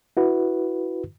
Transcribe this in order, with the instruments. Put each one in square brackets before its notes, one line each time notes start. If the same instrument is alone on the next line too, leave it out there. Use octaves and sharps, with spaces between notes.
[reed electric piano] E4 F#4 B4